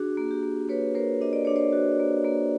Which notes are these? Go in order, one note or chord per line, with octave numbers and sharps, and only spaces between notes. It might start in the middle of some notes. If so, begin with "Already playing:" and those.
Already playing: D4 F#4 G#4
A#3
G4
A#3
A#3 B4 C#5
A#3 A#4 C5
D4 D#5
D5
D4 C#5
C5 D5
F#4
A#3
A#3